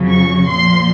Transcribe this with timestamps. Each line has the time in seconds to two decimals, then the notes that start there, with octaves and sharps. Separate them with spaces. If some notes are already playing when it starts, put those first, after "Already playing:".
Already playing: F2 C#3 F#3
0.08 C#6
0.47 A#2 F3 C6